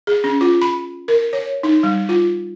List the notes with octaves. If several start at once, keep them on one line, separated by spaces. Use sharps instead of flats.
G#4
C#4
F4
B5
A#4
C#5
D#4
G3
F4